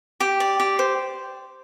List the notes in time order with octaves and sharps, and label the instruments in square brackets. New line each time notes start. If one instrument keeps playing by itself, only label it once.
[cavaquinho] G4 G5
D5
G4
C5